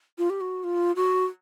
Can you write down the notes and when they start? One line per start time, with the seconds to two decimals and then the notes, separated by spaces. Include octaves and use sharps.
0.18 F4
0.30 G4
0.41 F#4
0.64 F4
0.96 F#4